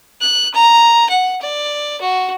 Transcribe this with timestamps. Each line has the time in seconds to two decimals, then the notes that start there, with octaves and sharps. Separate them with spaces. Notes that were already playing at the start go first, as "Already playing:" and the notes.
0.21 F#6
0.54 A#5
1.10 F#5
1.42 D5
2.01 F#4